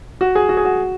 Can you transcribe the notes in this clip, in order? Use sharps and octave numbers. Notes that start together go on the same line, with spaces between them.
F#4
G#4
F#4
G#4
F#4